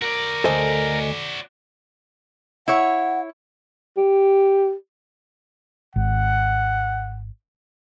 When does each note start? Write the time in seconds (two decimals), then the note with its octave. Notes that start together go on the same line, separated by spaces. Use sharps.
0.02 F#4 A#4 D5
0.44 D2 A4 C5 D#5 G#5
2.68 E4 C#5 F#5
3.98 G4
5.96 G#1 F#5